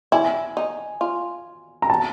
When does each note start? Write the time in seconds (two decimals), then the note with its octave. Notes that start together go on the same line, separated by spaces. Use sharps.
0.12 E4 G#5
0.57 D#4
1.01 F4
1.82 A#5
1.90 A5